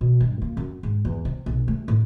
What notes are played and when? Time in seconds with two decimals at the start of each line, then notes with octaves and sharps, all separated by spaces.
0.01 B2
0.21 G2
0.42 A#3
0.57 F#2
0.83 G#2
1.05 E2
1.25 C3
1.46 B1
1.68 A3
1.88 A2